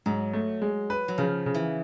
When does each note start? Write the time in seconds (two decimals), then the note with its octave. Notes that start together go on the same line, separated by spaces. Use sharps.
0.06 G#2 F#3
0.33 A3
0.62 G#3
0.90 B4
1.08 F#3
1.18 C#3 F3
1.46 C#3
1.54 E3